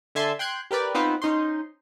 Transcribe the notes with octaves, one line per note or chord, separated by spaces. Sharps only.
D3 E5 G#5 A5 C6
G5 C6 F#6 G#6
G4 A#4 B4 D5
B3 C4 D#4 F4 B4 C5
C#4 D#4 C5 C6